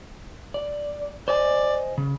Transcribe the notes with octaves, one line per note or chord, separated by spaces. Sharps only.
D5
C5 D5 D#5 G#5
C#3